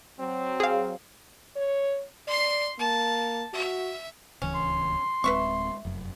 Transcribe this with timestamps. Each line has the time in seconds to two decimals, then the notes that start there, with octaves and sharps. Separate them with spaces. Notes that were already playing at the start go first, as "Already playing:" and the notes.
0.19 F#3 C4
0.60 G#4 F5
1.56 C#5
2.27 D5 C6 C7
2.79 A#3 A5
3.53 F#4 E5
4.42 D1 C#2 E3 C#4
4.55 C6
5.24 D1 G#3 C4 B4 E5 C#6
5.85 F1 F#2